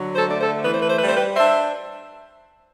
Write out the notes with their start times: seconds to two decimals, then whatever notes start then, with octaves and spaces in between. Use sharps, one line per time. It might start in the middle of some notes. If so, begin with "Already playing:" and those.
Already playing: D3 F#3
0.15 A4 C5
0.27 A3 D5
0.40 A4 C5
0.64 E3 B4
0.73 C5
0.82 B4
0.90 C5
0.99 G3 B4
1.07 C5
1.16 G4 B4
1.37 D4 C5 E5